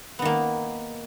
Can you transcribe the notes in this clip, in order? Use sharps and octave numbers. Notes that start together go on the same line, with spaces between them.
D#3 A#3 B3